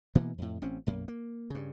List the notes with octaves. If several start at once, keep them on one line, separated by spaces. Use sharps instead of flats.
B2 E3 A#3 B3
F2 A2
A1 C4 C#4
B1 F#2 A#3
A#3
G2 C#3